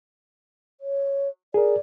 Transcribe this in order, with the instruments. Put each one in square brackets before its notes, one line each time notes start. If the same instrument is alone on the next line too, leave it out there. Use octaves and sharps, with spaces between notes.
[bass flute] C#5
[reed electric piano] G#4 A#4 [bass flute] D5